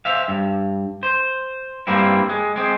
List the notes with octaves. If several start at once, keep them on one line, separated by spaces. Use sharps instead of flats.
C5 E5 F5
G2
C5
G2 G3 A#3 C4 E4
G#3
G#3 C4